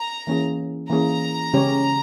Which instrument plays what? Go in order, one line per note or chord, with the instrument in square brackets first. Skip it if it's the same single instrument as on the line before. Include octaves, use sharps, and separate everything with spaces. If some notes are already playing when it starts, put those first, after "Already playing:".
Already playing: [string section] A#5
[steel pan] E3 A#3 C#4 G#4
[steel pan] E3 A#3 C#4 G#4 [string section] A#5
[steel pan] C#3 G#3 C#4 G4 C#5